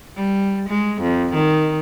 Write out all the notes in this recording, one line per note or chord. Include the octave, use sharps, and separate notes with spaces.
G3
G#3
F2
D#3